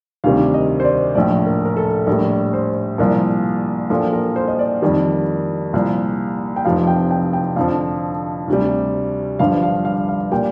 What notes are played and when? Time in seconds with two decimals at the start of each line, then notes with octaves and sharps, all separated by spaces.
0.24 D2 C3 D#3 G3 F5
0.54 D#5
0.80 C5
0.85 D5
1.15 A#1 A2 F3 D5
1.47 A#4
1.65 A#4
1.77 A4
2.07 A#1 A2 G3 A#4
2.53 C5
2.98 C2 A#2 F3 A#4
3.90 A#1 A#2 F3 A4
4.13 A#4
4.36 C5
4.48 D#5
4.59 D5
4.82 F2 D#3 G3
5.73 C2 A#2 F3
6.56 G5
6.65 F1 F2 C3 F3 F5
6.87 G5
7.11 G5
7.33 G5
7.56 F2 D3 F3 F5
8.48 D2 C3 G3
9.39 G1 G2 D3 F3 F5
9.63 F5
9.85 F5
10.09 F5
10.32 A#2 G3 G5